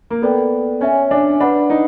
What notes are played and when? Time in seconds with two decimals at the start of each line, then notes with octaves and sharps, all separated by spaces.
0.10 A#3
0.22 B3 A4 D5 G5
0.81 C#4 C#5 E5 G#5
1.11 D4
1.40 D4 B4 D5 F#5 B5
1.70 D#4